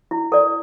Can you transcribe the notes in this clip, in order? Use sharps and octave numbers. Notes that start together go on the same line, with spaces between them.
E4
A4 D5